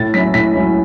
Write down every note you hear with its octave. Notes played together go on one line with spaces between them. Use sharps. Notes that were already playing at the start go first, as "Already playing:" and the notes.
Already playing: A2 A6
F#3 C#4 E4 B6
A2 B6
F#3 C#4 E4